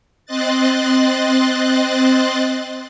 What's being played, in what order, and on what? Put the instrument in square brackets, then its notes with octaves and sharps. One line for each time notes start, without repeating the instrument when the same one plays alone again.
[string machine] C4 C5 D#5 F#6 A6